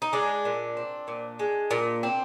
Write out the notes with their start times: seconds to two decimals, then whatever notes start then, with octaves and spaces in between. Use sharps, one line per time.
0.02 D#4
0.13 G#3 D4
0.45 A#2
0.77 C4
1.08 A#2
1.39 G#3
1.71 A#2
2.03 C4